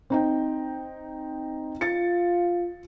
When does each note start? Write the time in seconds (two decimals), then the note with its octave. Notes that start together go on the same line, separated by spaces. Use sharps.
0.10 C4 D#4 G5
1.81 F4 A6 C#7